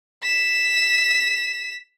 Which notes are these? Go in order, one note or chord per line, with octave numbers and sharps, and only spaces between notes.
B6 E7